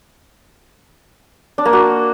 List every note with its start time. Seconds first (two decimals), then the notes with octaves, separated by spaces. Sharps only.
1.58 D4
1.65 A#3
1.73 F#4